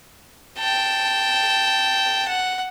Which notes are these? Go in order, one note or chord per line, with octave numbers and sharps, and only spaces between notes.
G5 A5
F#5